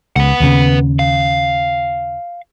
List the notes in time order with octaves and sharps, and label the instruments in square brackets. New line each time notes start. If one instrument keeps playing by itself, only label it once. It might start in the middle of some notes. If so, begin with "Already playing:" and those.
[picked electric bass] C#2 [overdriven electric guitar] B4 F#5
[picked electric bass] D#2 C#3
[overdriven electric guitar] F5